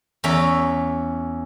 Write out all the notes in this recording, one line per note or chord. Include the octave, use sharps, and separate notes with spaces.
E2 C#4 E5 A#5